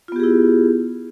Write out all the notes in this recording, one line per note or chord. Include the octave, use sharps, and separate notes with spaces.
B3 E4 F4 G4 G#4